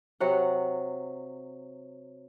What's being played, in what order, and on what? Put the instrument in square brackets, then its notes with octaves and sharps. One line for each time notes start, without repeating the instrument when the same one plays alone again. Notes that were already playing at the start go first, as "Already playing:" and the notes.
[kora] C3 F#3 F#5